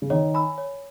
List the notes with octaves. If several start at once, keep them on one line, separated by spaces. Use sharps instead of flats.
C#3
D#3 C#5
G#5 B5 E6
C#5